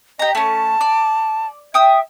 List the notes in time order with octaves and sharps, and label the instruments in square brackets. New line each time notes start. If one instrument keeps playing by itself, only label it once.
[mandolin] G4 A#5 [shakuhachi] D#5
[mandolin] A3 C#4 [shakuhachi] A5
[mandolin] D5
[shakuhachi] E5 [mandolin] G5 D#6 E6